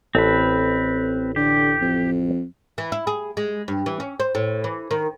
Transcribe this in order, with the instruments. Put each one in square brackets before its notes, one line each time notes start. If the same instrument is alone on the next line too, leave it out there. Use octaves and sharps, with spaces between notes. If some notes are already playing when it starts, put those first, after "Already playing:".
[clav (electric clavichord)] A1 A4 C5 [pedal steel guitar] C4 B4
[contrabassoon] D3 [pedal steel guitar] G4
[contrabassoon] F2
[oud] E3
E4
G#4
G#3
G2
E3
C#4
C5
A2
E3
D#3